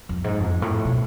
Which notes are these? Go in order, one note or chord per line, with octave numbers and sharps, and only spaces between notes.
F2
G#2
F2
A2
B2